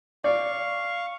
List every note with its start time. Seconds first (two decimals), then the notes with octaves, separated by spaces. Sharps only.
0.24 D5 F5 C#6